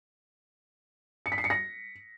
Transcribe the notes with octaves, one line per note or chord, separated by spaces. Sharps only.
C#7
B6
C7
C#7
A#6